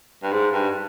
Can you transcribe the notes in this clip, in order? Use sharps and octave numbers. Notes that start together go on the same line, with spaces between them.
G2
G#2
G2